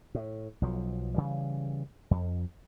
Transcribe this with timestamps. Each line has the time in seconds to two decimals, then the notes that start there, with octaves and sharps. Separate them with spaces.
0.15 A2
0.62 B1 F3 F#3
1.14 C#3 E3 G3
2.11 F2